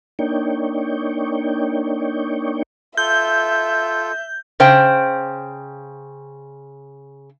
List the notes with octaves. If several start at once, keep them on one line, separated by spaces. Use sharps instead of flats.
A#3 D4 D#4 C#5 G5
F4 A4 E5 G6
C#3 C5 G5